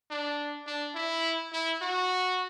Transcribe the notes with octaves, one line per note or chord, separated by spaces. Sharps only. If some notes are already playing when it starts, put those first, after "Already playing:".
D4
D4
E4
E4
F#4